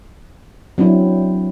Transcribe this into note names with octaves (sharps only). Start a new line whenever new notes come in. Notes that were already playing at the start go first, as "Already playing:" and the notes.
F#3 C4 D4 E4